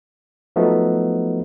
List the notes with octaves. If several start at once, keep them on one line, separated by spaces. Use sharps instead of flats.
F3 F#3 A3 B3 D#4